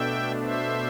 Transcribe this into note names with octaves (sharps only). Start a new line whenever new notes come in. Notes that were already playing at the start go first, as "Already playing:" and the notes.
Already playing: B2 A3 D4 E5 G5
C5 E5